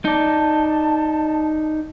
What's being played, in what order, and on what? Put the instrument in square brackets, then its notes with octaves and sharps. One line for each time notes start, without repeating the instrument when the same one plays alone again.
[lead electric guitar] D#4 D5 [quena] A5